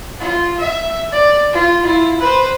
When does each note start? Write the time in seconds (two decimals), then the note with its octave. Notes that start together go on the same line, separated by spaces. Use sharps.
0.20 F4
0.59 E5
1.12 D5
1.53 F4
1.83 E4 F4
2.19 B4 C5